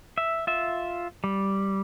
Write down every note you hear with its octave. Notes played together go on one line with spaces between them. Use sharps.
E5
F4 E5
G3